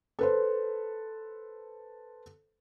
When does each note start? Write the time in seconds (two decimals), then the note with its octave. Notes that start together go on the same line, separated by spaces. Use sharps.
0.19 A4 B4 C5